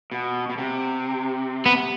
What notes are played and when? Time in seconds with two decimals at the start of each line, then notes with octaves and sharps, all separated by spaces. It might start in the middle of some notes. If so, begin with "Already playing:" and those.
0.12 B2
0.50 B2
0.58 C3
1.66 B3